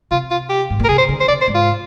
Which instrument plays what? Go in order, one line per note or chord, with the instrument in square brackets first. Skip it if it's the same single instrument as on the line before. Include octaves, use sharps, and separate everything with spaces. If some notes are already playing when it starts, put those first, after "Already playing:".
[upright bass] C3 [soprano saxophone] F4
[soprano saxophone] F4
G4
[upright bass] G#2
A#2
[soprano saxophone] A#4
[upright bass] C3 [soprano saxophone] G#4
[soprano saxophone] C5
[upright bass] D3
[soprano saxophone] C5
[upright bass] C3 [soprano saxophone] D5
[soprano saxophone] C5
[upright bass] G#2
[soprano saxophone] F4